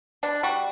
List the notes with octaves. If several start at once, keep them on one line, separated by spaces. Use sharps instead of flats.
B2 D4
G3 F#4